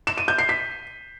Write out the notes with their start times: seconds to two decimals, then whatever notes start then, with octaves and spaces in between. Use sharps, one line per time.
0.07 E7
0.18 D#7
0.28 G6
0.38 C7
0.49 B6